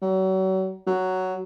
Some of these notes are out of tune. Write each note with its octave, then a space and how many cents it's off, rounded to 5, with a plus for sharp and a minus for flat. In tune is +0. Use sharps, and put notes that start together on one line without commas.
F#3 +35
F#3 +5